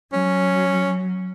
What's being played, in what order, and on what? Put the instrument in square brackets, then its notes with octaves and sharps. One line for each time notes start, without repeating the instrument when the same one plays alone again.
[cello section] F#3 [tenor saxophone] C#4